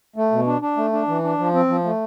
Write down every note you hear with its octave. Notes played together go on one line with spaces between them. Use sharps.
A3
B2
D4
D4
A3
D4
E3
D4
F3
C4
F3
A3